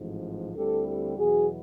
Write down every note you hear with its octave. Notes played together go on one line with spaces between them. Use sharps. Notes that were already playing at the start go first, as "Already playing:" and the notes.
Already playing: A1 G#2 F3
D2 D3 G3 C4 E4 G4 A4
G4 A4
E2 B2 F#3 B3 E4 F#4 G#4